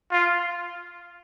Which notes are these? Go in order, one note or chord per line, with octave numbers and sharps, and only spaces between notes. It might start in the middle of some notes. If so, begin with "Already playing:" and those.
F4